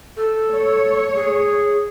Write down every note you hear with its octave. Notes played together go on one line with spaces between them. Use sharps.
A4
C#5
G#4